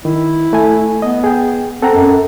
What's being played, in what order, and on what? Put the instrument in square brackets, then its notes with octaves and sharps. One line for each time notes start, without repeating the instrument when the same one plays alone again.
[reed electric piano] D#3 [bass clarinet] E4
[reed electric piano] A3 G#5
[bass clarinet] B3 [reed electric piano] D#5
[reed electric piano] G#4 G5
[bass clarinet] C4 [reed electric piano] A4 F#5 A#5
[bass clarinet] F#2